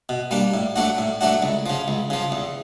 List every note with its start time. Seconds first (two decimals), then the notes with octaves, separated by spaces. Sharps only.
0.09 B2
0.31 G3 A#3 D4
0.54 A2
0.76 F#3 A3 D4 F#4
0.98 A2
1.21 F#3 A3 D4 F#4
1.42 C#2
1.66 C#3 F3
1.88 C#2
2.10 C#3 F3
2.32 E2